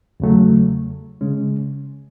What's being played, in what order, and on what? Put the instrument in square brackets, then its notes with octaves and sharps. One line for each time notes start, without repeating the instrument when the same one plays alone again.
[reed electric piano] E2 C#3 F#3 A3
C#3 G#3 C#4